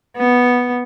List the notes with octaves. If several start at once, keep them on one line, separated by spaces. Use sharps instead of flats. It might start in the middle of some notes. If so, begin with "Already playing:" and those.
B3